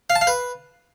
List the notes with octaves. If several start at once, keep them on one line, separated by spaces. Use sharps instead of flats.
F5
A5
F5
B4